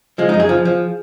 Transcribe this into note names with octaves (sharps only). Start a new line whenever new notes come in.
F3 G#3
F#2 D#4
G#4
F3
F3